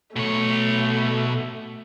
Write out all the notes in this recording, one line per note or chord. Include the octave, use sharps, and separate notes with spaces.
B2 A3 C#5